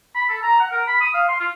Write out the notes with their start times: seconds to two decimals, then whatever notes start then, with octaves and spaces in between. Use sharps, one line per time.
0.15 B5
0.29 A4
0.42 A#5
0.60 F#5
0.71 A#4
0.87 B5
1.01 D#6
1.14 F5
1.28 C6
1.40 F4